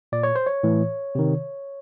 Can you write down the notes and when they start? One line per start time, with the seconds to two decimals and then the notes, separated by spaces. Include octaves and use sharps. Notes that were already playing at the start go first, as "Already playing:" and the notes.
0.12 A#2 D5
0.23 C#5
0.36 C5
0.47 C#5
0.63 A2 E3
1.15 C3 D#3